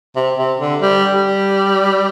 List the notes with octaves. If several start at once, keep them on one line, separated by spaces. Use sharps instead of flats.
C3
C3
D3
G3
G3